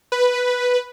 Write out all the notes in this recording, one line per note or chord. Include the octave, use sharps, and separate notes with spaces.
B4